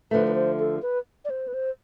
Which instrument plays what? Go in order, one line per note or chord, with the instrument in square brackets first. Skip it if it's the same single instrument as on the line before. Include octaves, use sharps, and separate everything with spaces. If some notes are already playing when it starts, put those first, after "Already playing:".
[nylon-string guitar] D3 F3 A3 [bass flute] B4
[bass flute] B4
C5
A4
B4
D5
C5
B4
C5